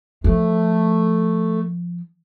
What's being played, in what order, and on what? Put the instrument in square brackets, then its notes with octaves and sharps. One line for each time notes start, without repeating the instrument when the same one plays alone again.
[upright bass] F3 [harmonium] A3